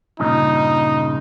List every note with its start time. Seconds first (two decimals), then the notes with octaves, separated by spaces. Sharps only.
0.20 G2 A#2 C#3 D#4